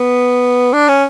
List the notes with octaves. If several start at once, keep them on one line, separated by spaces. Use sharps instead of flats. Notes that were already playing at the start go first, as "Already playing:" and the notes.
Already playing: B3
D4
C#4